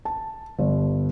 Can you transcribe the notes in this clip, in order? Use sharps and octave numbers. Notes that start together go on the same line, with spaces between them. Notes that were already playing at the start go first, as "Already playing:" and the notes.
A5
G1